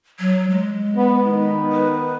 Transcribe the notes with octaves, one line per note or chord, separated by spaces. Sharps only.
F#3
G#3
B3
D#3 B3 D#4
B4